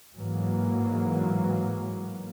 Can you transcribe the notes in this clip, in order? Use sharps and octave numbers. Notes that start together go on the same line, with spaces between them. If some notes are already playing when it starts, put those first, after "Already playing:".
G#2 E3 F#3 A#3